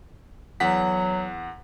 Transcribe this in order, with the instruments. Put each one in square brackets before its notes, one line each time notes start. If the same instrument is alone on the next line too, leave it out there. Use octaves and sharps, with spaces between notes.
[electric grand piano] E2 F#5 B6 [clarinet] F#3